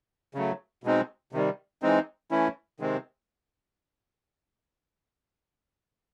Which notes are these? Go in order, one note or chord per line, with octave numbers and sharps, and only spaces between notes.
C#3 F#3 A3
B2 G#3 C4 D#4
C3 D#3 G3
E3 G#3 C4 D#4
E3 A3 C#4 E4
C3 D#3 G#3 C4